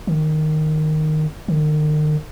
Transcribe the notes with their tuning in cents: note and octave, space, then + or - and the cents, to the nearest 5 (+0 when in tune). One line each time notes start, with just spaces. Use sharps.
D#3 -10
D#3 -40